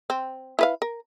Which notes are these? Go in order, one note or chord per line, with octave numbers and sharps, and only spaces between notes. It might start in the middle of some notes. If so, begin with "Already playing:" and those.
C4
E4 B4 F5
A#4